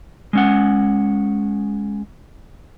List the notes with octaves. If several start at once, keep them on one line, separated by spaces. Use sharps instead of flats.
G#3 C#4 F#5